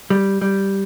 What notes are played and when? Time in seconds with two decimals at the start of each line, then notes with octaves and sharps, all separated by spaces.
0.10 G3
0.41 G3